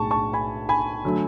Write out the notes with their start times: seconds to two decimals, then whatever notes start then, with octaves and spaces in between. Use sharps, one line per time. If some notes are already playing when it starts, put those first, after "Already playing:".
Already playing: B1 A2 G#3 A5 C#6
0.11 A5 C#6
0.33 G#5 B5
0.69 G#5 B5
1.05 D3 F#3 A3